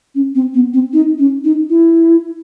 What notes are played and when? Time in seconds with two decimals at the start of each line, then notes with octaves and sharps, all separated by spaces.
0.15 C#4
0.35 C4
0.54 B3
0.74 C4
0.93 D#4
1.19 C#4
1.44 D#4
1.70 E4